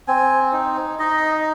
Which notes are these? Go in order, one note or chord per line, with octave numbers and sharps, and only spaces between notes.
C4 G#5
D#4
D#4 D#5